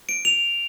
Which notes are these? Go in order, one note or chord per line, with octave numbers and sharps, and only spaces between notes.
D7
F7